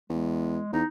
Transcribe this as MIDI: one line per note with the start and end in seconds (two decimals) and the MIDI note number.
0.10 0.60 40
0.10 0.71 56
0.73 0.83 40
0.73 0.86 63